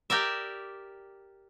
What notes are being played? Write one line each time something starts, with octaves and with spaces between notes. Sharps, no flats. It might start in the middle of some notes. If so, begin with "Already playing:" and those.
G4 A#4 D5 E5